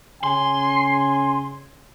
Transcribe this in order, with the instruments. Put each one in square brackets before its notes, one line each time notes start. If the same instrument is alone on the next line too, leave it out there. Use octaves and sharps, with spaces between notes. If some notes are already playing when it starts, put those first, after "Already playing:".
[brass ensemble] C#3 G#5 [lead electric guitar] C6